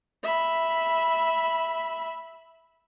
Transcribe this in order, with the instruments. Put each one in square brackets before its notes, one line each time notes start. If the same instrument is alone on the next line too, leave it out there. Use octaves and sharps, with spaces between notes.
[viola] E5 B5